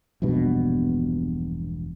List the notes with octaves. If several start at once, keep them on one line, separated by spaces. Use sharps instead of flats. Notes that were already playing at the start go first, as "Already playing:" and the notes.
E1 A#1 G2 B2